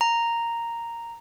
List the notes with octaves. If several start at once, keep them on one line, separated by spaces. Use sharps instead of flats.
A#5